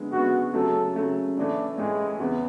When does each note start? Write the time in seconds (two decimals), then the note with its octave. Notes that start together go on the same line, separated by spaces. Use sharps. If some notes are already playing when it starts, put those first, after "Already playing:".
Already playing: F#2 D3 G#3 B3
0.12 F#2 D3 G#3 B3 F#4
0.53 C#3 F#3 A3 A4
0.96 C#3 F#3 A3
1.37 A2 E3 A3 D4
1.78 A2 E3 G#3 A3
2.20 E2 C#3 E3 B3